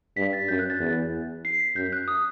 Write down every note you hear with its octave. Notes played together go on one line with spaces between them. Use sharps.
G2 B6
A6
F#2 G6
F#6
A6
E2
C7
B6
F#2 G6
F#6
D#6